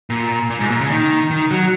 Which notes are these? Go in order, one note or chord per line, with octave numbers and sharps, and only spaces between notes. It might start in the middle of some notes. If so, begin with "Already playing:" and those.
A#2
A#2
G#2
A#2
C#3
D#3
D#3
F#3